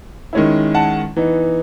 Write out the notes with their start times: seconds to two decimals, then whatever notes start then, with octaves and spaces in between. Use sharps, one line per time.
0.33 D#3 G#3 C#4 E4
0.75 F#5 A5
1.16 E3 B3 D#4